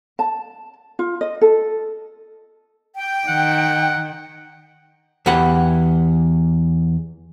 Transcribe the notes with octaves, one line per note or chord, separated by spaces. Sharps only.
A5
F4
D#5
A4
G5
D#3 F#5
E2 E3 G4 B4 F#5